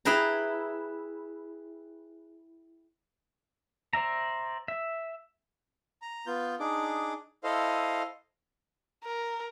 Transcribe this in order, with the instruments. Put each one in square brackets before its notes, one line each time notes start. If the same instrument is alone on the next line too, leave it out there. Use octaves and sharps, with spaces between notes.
[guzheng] E4 G#4 B4 G5 A#5
[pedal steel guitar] C5 D5 E5 A#5
E5
[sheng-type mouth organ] A#5
B3 F4 G6
D4 D#4 G#4 D6
E4 A4 C5 D#5 F5
[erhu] A#4